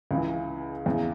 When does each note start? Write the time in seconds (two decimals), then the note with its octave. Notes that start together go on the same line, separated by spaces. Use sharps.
0.11 C#2 C#3 E3
0.86 E2 C#3 E3